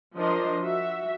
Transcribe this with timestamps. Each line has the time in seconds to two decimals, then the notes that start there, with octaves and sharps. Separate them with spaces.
0.16 F3 D4 A#4 D#5 C6
0.60 F#4 E5